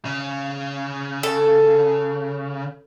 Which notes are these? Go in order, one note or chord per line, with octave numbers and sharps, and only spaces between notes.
C#3
A4